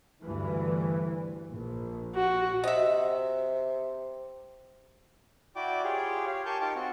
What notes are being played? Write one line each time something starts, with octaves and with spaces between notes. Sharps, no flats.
D2 G2 E3
A#1
F#4
C3 D#5 E5
E4 F#4 D5 G5 D6
F4 G4 G#4 C#5 G5
G4 C#5 F5
G4 A#4 G#5 A5 C#6 G6
D#4 F4 G4 A#4 G5 A5
C4 F#4